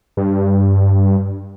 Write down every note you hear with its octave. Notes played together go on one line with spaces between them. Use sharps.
G2